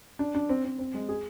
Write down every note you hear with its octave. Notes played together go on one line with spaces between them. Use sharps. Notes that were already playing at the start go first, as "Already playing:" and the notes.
D4
D4
C4
C4
C4
G#3
G#4